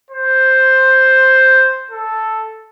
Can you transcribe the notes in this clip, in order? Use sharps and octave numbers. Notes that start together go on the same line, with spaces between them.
C5
A4